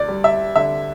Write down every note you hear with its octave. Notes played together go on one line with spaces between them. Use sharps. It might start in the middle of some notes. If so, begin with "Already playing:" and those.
Already playing: D2 D5
G3
E5
D3 E5